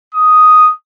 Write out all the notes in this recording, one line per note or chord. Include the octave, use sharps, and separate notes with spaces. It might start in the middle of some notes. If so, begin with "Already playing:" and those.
D#6